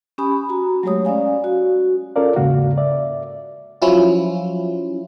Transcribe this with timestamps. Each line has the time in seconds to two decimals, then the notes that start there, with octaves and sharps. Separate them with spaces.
0.18 C#4 G4 G#5 B5 D#6
0.49 F#4 A#5
0.83 F#3 G#3 A3 G4 C#5 D#6
1.05 C#4 D5 F5 G#5
1.44 F#4
2.16 C#4 F4 A4 A#4 D5 F5
2.36 E2 G#2 C#3 A#3 F#4 F5
2.78 D5 E5
3.82 F3 F#3 C#4 E4 F4